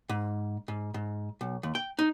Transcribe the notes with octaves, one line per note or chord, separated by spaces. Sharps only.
G#2
G#2
G#2
B1
D#2
G5
D#4